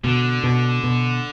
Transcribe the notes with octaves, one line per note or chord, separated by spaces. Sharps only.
B2 D3
B2
B2